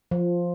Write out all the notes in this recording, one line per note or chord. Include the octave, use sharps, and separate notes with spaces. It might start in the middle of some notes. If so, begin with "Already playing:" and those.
F3